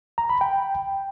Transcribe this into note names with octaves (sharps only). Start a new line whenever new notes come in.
A#5
B5
G5